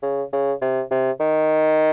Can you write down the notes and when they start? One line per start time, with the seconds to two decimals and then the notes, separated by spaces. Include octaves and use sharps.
0.03 C#3
0.32 C#3
0.61 C3
0.91 C3
1.20 D#3